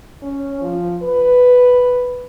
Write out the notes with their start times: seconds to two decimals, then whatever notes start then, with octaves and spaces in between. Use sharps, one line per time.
0.22 C#4
0.62 F3
1.02 B4